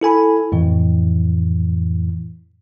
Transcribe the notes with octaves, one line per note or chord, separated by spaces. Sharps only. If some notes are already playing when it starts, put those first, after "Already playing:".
E4 A4 G#5 B5
F2 A2 E3